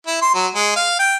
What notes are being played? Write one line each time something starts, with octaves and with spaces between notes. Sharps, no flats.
E4
C6
F#3
G#3
F5
G5